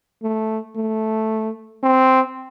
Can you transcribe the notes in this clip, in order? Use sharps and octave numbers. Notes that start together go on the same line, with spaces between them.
A3
A3
C4